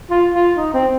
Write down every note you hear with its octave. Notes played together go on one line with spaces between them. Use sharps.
F4
F4
D#4
C4